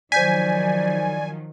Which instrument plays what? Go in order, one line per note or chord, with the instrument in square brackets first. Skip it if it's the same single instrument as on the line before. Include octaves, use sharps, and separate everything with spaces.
[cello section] D#3 F3 F#3 [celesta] C5 G6 B6 [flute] D5 [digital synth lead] G#5